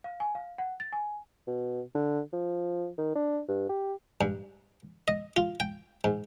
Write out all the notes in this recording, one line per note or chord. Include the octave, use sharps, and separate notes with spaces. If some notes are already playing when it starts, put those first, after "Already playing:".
F5
G#5
F5
F#5
A6
G#5
B2
D3
F3
D#3
D4
G2
G4
G2
D#5
F4
G5
G#2